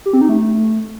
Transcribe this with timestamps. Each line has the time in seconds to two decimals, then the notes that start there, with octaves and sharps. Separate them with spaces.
0.06 G4
0.13 C4
0.21 D#4
0.29 A3